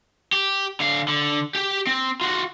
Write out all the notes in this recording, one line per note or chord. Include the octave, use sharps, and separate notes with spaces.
G4
D3 F5
D3
G4 G5
C4
F4 F#4